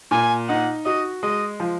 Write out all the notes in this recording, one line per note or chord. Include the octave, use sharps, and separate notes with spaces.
A#2 G#5
D#4 F#5
F#4 D#5
G#3 D#5
F3